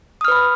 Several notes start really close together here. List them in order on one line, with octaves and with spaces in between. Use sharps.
D#6 F6 B4 B5